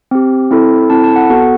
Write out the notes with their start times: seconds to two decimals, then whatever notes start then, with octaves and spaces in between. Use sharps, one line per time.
0.11 C4 G4
0.51 C4 E4 A4
0.90 C4 E4 A4 A5
1.04 A5
1.16 F#5
1.30 B3 F#4 A4 F#5